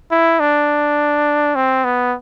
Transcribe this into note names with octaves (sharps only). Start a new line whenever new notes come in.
E4
D4
C4
B3